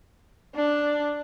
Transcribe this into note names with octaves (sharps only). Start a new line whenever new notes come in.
D4